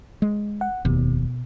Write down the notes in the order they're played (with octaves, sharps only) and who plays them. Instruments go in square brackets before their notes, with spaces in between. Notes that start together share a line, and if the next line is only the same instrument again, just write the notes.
[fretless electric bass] G#3
[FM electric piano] F#5
[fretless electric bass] F1 D#2 [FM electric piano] B2